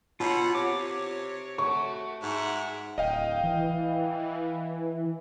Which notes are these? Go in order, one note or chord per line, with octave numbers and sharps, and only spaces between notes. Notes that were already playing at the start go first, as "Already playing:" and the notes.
B2 F4 C#5 F#5
C3 C#5 D6
A3 F#4 C#6
G#2 E5 F#5
D1 D#5 F5 G5
E3